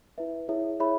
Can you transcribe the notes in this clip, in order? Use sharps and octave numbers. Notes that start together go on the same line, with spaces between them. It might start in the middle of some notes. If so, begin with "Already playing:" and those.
E4 B4 E5
E4 G#4 C#5 E5
E4 G#4 C#5 E5 B5